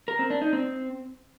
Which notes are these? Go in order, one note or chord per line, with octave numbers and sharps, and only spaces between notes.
A#4
C4
D4
D#4
C4